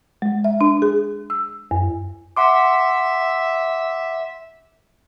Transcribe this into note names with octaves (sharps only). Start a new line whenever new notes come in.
G#3
E5
D4
G#4
E6
F#2
E5 F#5 C6 D6